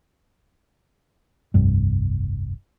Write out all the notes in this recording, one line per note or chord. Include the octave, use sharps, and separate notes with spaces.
F1 C2 G2